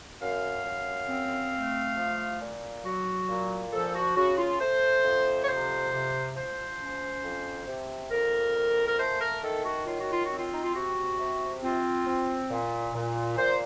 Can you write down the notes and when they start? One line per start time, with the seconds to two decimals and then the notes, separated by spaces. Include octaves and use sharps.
0.21 F#2 F5
0.65 F#2
1.09 C4
1.53 A3
1.97 F3
2.41 A#2
2.85 F#3 F#4
3.29 A#2
3.73 F3 A4
3.95 F#4
4.16 C#3 F#4
4.38 F4
4.60 A3 C5
5.05 F2
5.43 C#5
5.48 C3 C5
5.92 C3
6.36 F3 C5
6.80 C#4
7.24 F2
7.67 C3
8.11 F2 A#4
8.55 A#3
8.87 A#4
8.99 A3 C5
9.21 A#4
9.43 D#3 A4
9.65 F#4
9.87 F#3 F4
10.00 F#4
10.12 F4
10.25 F#4
10.30 C4
10.38 F4
10.54 D#4
10.64 F4
10.75 C3 F#4
11.19 C3
11.63 C4 F4
12.06 C4
12.50 A#2
12.94 A#2
13.38 A#2 C5